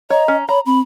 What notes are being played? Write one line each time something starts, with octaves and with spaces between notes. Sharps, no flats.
C#5 D#5 A#5
C#4
C#5 A#5 B5
C4 B5